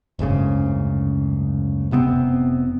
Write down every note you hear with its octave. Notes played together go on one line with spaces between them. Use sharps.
F#1 D2 G#2 C#3
F1 C3 B3 C4